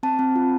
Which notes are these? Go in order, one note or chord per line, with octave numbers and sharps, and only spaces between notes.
C4 A5
C4
F4